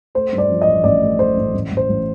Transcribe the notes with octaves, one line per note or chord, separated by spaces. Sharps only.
A3 C5
G2
D5
F3
D#5
A1
A1 D5
A3
A3 C5
A1
A1
A1
C5
A1